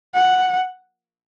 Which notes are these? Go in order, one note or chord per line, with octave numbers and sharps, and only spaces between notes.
F#5